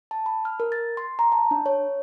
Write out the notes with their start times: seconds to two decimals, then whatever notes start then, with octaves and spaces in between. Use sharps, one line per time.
0.11 A5
0.26 B5
0.45 F6
0.60 A#4
0.72 A6
0.97 C6
1.19 A#5
1.32 A5
1.51 D4
1.66 C#5